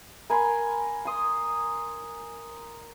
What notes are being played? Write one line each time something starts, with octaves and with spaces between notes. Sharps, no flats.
A#4 G#5 B5 C6
C6 D#6